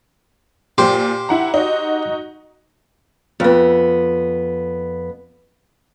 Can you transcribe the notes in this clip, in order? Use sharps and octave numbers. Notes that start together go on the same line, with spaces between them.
A#2 G4 C5
E4 F#5 A#5
D#4 F#4
F2 B3